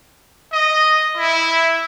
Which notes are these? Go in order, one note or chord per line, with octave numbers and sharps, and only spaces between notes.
D#5
E4